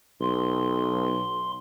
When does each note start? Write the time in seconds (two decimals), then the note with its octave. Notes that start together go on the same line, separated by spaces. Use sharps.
0.21 B1 C6